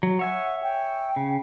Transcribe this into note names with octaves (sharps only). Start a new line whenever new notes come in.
F#3
C#5 E5 F#5 G#5
G5
C#3